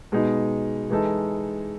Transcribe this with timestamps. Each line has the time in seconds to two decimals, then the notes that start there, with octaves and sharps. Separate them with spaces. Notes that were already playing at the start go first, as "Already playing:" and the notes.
0.12 B2 G#3 D#4
0.90 E3 G#3 D#4 A4